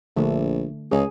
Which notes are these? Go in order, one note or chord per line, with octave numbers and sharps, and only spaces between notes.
A#1 D3 A3 D4
C#2 G#4